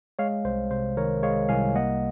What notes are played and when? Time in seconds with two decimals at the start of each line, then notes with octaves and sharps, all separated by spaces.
0.19 G#3 C#5 F5
0.45 C2 C5
0.71 C3 C5
0.97 D#3 A#4 C#5
1.23 G#3 C#5 F5
1.49 C2 F5 G#5
1.75 A#3 D#5 F#5